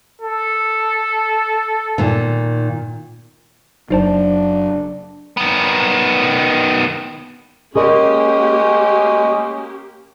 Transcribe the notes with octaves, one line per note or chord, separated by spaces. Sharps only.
A4
A#2 D#3
F#1 F#3 D4 D#4 C5 A5
D#3 B3
G#3 A#3 C#4 G4 G#4 A#4 D#5 D#6